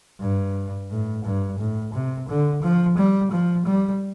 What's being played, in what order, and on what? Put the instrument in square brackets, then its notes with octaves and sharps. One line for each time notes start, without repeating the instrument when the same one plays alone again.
[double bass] G2
A2
G2
A2
C3
D3
F3
G3
F3
G3